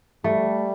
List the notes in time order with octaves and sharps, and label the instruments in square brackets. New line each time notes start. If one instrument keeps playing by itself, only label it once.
[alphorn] G3 [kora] A3